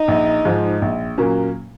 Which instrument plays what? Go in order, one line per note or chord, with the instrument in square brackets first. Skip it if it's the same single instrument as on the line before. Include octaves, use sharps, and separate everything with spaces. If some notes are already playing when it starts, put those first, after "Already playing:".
Already playing: [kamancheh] D#4
[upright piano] A#1
G#2 F3 G#3
A#1
A#2 F#3 A#3 C#4